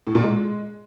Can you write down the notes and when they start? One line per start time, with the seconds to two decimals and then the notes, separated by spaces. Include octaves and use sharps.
0.07 A2
0.15 A#2
0.23 G#3